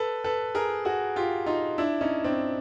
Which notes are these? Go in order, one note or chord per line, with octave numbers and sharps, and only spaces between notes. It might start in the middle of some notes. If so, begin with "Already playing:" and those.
Already playing: A4 B4
A4 B4
G#4 A#4
F#4 G#4
F4 G4
D#4 F4
D4 E4
C#4 D#4
C4 D4